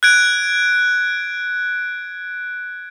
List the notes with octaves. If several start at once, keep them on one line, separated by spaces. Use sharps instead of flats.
F#6 G#6 D7